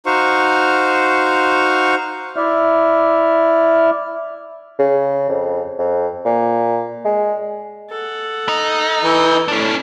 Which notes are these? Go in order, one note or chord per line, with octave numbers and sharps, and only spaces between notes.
D#4 F#4 C5 F5 C#6
E4 D5 E5 F6
C#3
F2
F2
A#2
G#3
A4 F#5
D#4
E3
A2 C#4 D4